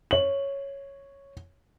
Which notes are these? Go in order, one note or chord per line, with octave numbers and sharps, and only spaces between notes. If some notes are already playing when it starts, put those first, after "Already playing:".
C#5 F#7